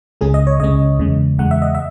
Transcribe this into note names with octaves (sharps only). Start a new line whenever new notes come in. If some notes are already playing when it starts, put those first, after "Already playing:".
C#2 C#3 G#3 C#4 G#4
D#5
C#5
C#2 C#3 G#3 C#4 D#5
E2 C#3 G#3
E2 C#3 G#3 F#5
E5
D#5
E5